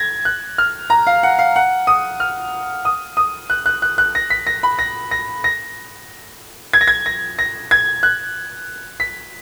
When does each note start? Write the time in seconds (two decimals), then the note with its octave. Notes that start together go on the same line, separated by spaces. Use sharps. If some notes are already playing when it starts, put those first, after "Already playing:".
Already playing: G#6 A#6
0.25 F#6
0.58 F6
0.90 A#5
1.07 F5
1.23 F#5
1.38 F5
1.56 F#5
1.87 D#6
2.20 F6
2.85 D#6
3.17 D#6
3.50 F#6
3.66 F#6
3.82 F#6
3.98 F#6
4.15 A#6
4.30 B6
4.47 A#6
4.63 B5
4.79 A#6
5.11 A#6
5.44 A#6
6.73 G#6
6.81 A#6
6.88 G#6
7.06 A#6
7.39 A#6
7.71 G#6
8.03 F#6
9.00 B6